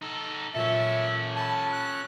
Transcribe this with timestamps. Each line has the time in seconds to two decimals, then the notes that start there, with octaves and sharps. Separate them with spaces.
0.02 D#4 A4
0.55 A#2 F#3 C#4 A4 E5
1.36 F#5 G#5 A5 B5
1.72 F#6